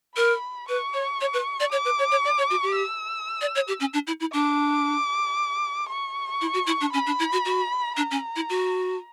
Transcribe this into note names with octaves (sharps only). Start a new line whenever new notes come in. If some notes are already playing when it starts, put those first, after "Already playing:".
A#4 B5
B4 C#6
C#5
C#5
B4
D5
C#5 D6
B4
C#5
C#5
D5
C#5
F#4
G4
E6
D5
C#5
G4
C#4
D4
E4
E4
D4 D6
C#6
E4
F#4
E4
D4
C#4 B5
D4
E4
F#4
F#4
D4 A#5
C#4
E4
F#4